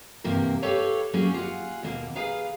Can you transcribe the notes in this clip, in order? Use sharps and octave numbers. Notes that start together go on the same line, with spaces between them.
E2 G2 C3 A#3 A#4
G4 A4 B4 C#5 F5
F#3 G3 A#3 C#4 G#4
F4 G#4 F#5
D#2 B2 A#3
G#4 B4 F5 A#5